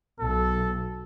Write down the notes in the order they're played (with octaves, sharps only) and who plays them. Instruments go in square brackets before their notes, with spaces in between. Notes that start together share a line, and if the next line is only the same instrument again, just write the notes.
[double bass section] B1 [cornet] A4